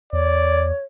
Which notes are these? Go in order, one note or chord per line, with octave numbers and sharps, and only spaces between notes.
E2 C#5 D5